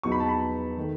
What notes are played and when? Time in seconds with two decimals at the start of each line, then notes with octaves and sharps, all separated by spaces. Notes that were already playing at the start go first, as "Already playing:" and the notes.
0.03 E2 C#3 F#3 B3 D#4 C#6
0.12 B5
0.20 A5
0.28 B5
0.77 D#3 A3